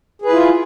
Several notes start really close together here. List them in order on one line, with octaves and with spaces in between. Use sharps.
G#4 B4 E4 F4